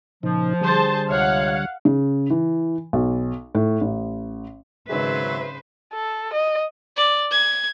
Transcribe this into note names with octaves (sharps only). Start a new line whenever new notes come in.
A#2 C#3 F3 D#4
D3 G3 G#4 C5 A5
C#2 C3 C#5 F5 F#5
C#3
E3
B1
A2
A1
G#1 C#3 F#3 G#4 B4 C5 E5
A4
D#5
D5
G#6